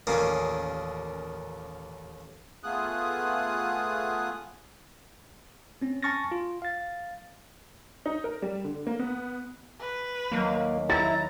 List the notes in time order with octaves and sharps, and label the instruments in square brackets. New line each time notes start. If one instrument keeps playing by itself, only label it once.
[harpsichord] A1 D#2 A#2 A#3 C#4 G#4
[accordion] A3 B3 F4 G#4 D#6 F#6
[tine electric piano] C4 C#4
G#5 A5 C#6 F6 A6 A#6
F4
F5 A6
[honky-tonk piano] D#4
A#4
G3
D3
A#3
B3
[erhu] B4
[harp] D#2 F#3 [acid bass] A#3
[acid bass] E4 [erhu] A#5 [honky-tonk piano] A6